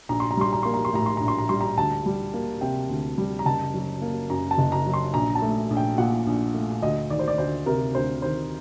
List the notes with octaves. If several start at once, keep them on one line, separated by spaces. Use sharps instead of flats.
A#1 A#5
C6
A#5
G3 C6
A#5
A#3 C6
A#5
C6
A2 A#5
C6
A#1 A#5
C6
A#5
G3 C6
A#5
D2 A5
G3
A#3
C3 G5
D2
G3
A#5
F#1 A5
F#3
A#3
F#2 A#5
A5
F#1
A#5
F#3
C6
A#1 A#5
A5
A3
A#1
G5
A#2 F#5
A#1
A3
D2 D#5
D#3 D5
C5
D5
D2 C5
C3 A#4
D2 C5
D#3 C5